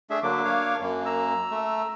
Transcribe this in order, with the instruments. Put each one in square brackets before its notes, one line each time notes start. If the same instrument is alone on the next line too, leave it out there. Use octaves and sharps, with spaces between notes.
[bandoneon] A3 D4 E5 [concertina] G#4
[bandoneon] D3 F#3 [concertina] A#3 D4 D6
[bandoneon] C#5 F5
F#2 A#3
[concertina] A#5 E6
[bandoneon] A3